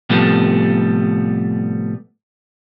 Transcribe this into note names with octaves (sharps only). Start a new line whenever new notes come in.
A2 C3 F3 G3 A3 B3